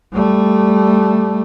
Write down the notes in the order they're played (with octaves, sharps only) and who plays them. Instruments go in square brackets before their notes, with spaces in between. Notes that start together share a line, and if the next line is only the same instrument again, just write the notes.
[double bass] G3 A3